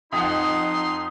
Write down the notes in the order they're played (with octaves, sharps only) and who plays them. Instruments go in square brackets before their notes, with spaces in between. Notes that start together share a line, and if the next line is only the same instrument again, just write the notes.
[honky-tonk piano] F2 F#5 [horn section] D#4 [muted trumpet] C6 [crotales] D#6